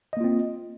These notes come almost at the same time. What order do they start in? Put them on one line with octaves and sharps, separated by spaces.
D#5 A#3 F4 C4